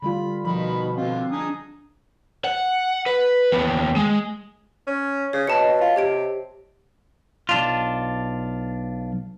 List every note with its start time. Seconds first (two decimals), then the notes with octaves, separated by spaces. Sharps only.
0.02 D3 G3 F4 B5
0.45 B2 D#3 F3 B5
0.97 D3 C4 F4
1.32 D4 G#4 A#5 D#6
2.44 F#5
3.06 B4
3.52 D#2 B3
3.96 G#3
4.87 C#4
5.33 C#3 C#5
5.47 B2 D#5 A5 C#7
5.81 F4
5.96 C3 G4 G#6 D7
7.49 B1 D4 F4